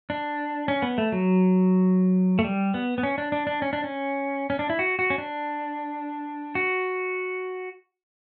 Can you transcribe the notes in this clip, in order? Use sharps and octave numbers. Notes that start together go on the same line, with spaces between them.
D4
C#4
B3
A3
F#3
A3
G3
B3
B3
C#4
D4
D4
D4
C#4
D4
C#4
C#4
D4
E4
F#4
F#4
C#4
D4
F#4